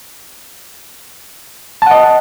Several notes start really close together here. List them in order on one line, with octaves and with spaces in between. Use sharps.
A5 F#5 D#5